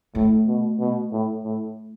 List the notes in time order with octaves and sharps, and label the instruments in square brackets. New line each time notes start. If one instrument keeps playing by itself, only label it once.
[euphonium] A2 [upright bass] A3
[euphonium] B2
B2
A2
A2